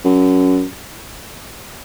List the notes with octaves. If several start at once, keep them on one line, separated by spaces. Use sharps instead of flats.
F#2